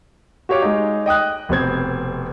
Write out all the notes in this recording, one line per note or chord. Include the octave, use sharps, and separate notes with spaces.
F#4 G4 C#5 F5 D6
G#3 D#4
D#5 G5 D#6 F#6
F1 B2 C4 G#6